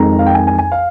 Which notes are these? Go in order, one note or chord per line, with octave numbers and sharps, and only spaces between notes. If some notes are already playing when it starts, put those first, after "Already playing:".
Already playing: F2 D#3 G#3 A#5
F5
G5
G#5
G#5
G#5
F5